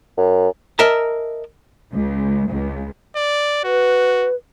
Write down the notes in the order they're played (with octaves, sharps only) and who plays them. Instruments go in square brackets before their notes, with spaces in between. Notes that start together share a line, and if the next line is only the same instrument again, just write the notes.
[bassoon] F#2
[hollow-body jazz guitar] A#4 D#5 E5 A5 A#5
[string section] C#2
C#2
[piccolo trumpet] D5
[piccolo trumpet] F#4 [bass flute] B4